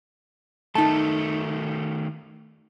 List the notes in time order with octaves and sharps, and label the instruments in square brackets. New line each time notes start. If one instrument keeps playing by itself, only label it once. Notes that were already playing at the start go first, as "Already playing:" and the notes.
[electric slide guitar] D#3 A3 [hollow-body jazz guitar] D#4 A5